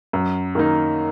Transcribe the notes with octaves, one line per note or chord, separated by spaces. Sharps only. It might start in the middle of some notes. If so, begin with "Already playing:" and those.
F#2
D#3 A#3 D#4